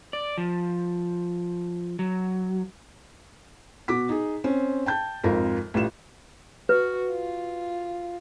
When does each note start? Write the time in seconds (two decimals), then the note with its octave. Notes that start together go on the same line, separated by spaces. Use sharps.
0.13 D5
0.38 F3
1.99 F#3
3.88 B2 F#4 D6 B6
4.09 D#4 G#4
4.44 C4 C#4 C5
4.86 G5 A5 G6
5.24 G#1 F2 F4 A#4
5.74 A1 G3 F4 E7
6.69 F#4 B4
7.10 F4